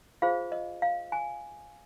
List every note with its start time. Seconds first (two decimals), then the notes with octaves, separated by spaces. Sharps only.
0.22 F4 G#4 C5 F5
0.52 D#5
0.82 F5
1.12 G#5